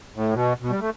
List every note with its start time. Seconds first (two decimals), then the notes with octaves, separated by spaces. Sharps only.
0.15 A2
0.34 B2
0.62 B2
0.70 G3
0.80 A3